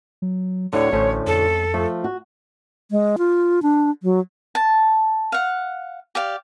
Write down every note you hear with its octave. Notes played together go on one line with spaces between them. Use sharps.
F#3
D2 A2 D3 C#5
A1 D2 A2 A3 C#4 C5
F2 A4
F3 A3
F#4
G#3
F4
D4
F#3
A5
F5 F#5
G4 D5 F5